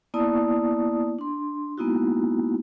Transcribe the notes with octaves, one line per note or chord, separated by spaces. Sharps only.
A#3 B3 E4 D5 A5 D#6
D4 C6
G#3 A#3 B3 D#4 E4 F#4